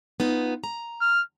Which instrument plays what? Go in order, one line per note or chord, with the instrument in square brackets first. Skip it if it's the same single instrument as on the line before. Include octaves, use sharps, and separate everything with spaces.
[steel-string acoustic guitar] B3 D#4 F4
A#5
[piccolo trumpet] F6